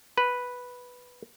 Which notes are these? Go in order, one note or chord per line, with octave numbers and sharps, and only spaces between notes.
B4